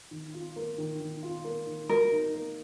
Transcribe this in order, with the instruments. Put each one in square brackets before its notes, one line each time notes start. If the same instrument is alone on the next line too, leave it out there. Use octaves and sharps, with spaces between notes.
[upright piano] D#3
F4
A#3
D#3
D#3
F4
A#3
D#3
[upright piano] F#4 [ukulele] A#4
[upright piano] D#4
A#3